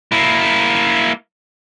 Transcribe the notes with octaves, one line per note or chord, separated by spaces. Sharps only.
A#3 E4